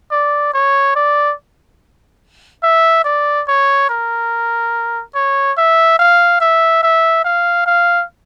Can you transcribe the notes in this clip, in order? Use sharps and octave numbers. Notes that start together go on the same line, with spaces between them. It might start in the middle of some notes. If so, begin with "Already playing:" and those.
D5
C#5
D5
E5
D5
C#5
A#4
C#5
E5
F5
E5
E5
F5
F5